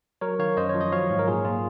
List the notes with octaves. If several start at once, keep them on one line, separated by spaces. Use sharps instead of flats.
F#3 A#4 C#5
D#3 C#5 F5
F#2 C5 D#5
C#5
F3
D#5
F#3 C#5 F5
G#2
A#4
A#2 F4 G#4
A#2 F4